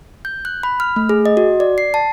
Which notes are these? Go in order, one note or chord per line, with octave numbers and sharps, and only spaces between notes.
G6
F#6
B5
F6
A3
G#4
D#5
F#4
D5
C7
A5